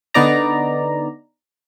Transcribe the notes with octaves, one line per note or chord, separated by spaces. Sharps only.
D3 B3 D#4 D5 A#5